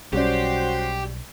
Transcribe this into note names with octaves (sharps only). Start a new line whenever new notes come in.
B1 G3 C#4 F#4 G4 C5 D5